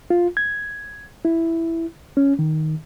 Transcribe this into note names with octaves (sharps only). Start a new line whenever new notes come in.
F4
G#6
E4
C#4
D#3